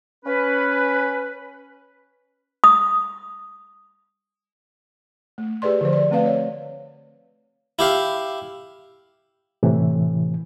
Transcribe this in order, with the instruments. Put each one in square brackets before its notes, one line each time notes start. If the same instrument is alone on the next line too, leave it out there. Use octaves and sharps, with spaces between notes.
[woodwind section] C#4 B4
[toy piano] D#6
[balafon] A3
G4 G#4 B4 D5 C6
D3 F3 C5
D5
A3 C4 B4 F5
C#5
[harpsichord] E4 G4 F5
[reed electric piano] A2 C3 E3